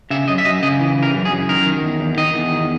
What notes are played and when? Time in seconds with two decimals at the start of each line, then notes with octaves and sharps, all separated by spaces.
0.10 C#3 E5
0.28 F#2 D#5
0.38 E5
0.45 F#2 D#5
0.63 C#3 D#5
0.79 E3
0.97 E3
1.03 A#4
1.14 F#2
1.25 G#4
1.31 F#2
1.49 D#3 A#4
1.66 D#3
1.83 E2
2.00 E2
2.17 D#3 D#5
2.34 E2
2.51 D#3